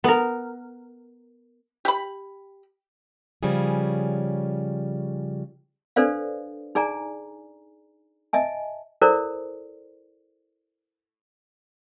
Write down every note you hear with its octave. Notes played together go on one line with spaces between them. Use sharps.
B3 A#4
G4 B5
C#3 F3 G3 C#4 G#4
D4 A4 B4 C5 D5 F5
D#4 G#4 D5 G#5 A#5
D#5 E5 G#5 A5
E4 A4 A#4 C5 D5